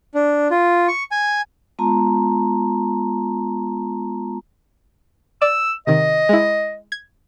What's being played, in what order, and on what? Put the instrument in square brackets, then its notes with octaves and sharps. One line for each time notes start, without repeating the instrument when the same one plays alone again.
[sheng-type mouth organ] D4
F4
C#6
G#5
[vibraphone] G#3 B3 F4 A5 A#5 C6
[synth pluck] D5 [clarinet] E6
[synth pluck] C3 D#3 [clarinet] D#5
[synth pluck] G#3 E4
G#6